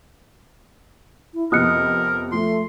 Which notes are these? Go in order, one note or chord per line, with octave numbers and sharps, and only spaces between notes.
E4
F2 C3 B3 A#4 D#5 D#6 F#6 C#7
F3 A3 C6